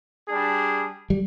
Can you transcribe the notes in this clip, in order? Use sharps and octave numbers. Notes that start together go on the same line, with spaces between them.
G3 D4 G#4
G3